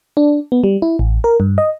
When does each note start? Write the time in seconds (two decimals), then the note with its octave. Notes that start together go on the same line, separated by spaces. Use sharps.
0.17 D4
0.52 B3
0.64 G3
0.82 E4
0.99 A1
1.24 A#4
1.40 G2
1.58 D#5